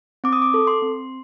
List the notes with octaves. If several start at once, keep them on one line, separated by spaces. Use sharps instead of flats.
C4 D6
D#6
D6
A4
C6
C4